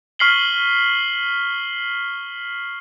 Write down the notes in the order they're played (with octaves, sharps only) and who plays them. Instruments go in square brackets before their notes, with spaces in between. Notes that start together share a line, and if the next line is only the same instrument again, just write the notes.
[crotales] C#6 F6 B6 C7 F#7 G7